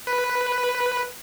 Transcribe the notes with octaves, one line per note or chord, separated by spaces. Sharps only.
B4